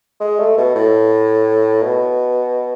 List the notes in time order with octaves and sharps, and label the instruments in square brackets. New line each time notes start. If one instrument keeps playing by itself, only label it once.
[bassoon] G#3
A3
B2
A2
B2